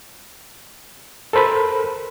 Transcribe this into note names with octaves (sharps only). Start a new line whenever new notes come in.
A4 A#4 C5 B5